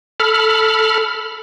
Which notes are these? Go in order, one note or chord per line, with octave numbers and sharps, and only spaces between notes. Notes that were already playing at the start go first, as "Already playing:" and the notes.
A4 B5 F6